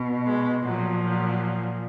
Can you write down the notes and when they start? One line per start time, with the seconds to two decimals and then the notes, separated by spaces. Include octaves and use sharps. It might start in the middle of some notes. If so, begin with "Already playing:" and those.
Already playing: B2
0.26 G#3
0.65 A#2 F3 F#3
1.04 F#3